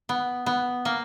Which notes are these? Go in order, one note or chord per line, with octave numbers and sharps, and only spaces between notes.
B3
B3
A#3